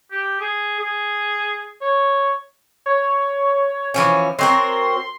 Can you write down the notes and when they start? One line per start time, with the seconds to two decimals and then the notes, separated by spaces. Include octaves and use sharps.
0.11 G4
0.40 G#4
0.80 G#4
1.81 C#5
2.86 C#5
3.94 E3 F3 C#4
4.39 F#3 C4 A#4 C6